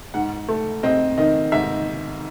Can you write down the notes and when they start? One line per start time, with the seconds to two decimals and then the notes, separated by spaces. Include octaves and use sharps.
0.14 G#2 F#5
0.49 A3
0.83 C4 D#5
1.18 D#3 D#5
1.52 G#2 E5